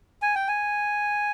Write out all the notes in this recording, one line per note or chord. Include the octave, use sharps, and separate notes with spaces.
G#5
G5
G#5